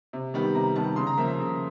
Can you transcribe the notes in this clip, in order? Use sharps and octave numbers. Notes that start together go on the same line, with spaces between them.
C3
D#3 G3 B3
C3 A#5
D#3 G3 B3 A5
C#3 C6
A#5
F3 A#3 E5
E5
C#3